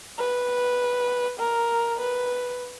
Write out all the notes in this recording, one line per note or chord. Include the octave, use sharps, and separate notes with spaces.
B4
A#4
B4